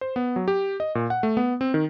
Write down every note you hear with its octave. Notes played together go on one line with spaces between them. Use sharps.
C5
B3
F#3
G4
D#5
A#2
F#5
A3
B3
C4
D#3